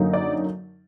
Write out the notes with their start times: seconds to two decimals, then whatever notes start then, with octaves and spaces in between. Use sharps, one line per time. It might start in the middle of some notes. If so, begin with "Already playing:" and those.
Already playing: F#2 D3 F#3 A#3 D#4
0.13 D5